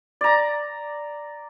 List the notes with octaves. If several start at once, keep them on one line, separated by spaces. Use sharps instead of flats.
D5 A#5